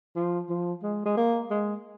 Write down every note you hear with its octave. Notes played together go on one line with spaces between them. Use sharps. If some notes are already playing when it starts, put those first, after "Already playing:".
F3
F3
G#3
G#3
A#3
G#3